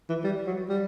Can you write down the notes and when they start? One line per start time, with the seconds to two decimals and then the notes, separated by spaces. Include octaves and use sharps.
0.09 E3
0.24 G3
0.46 F#3
0.69 G3